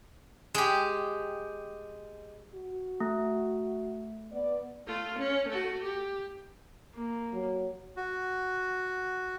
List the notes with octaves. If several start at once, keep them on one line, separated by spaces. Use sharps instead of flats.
G#3 G4
F#4
A3
B3 D5
A3 F4
C#4
A3 F#4
G4
A#3
F#3
F#4